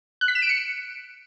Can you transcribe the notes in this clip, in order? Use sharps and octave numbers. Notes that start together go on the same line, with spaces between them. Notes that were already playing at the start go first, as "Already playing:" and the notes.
F#6
B6
E7
D7
C#7